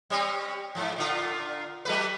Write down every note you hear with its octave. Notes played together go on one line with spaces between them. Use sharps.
G3 C4 C#4
G#2 F3
A#2 D3 F4
F#3 A3 B4